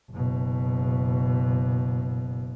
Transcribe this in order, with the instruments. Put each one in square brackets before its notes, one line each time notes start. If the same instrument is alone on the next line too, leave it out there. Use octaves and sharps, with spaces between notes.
[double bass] F#1 B2